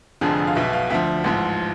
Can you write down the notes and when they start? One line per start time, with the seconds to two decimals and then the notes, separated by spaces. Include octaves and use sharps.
0.21 F1 F2 D3 F3 G#4
0.47 F5
0.55 B1 B2 E5
0.73 F5
0.90 D2 D3 F3 E5
1.24 A1 G#2 F3